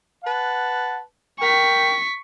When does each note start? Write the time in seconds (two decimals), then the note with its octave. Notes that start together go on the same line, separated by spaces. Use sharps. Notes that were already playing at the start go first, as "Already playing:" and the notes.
0.24 B4 F#5 A5
1.40 A#4 G5 C#6 B6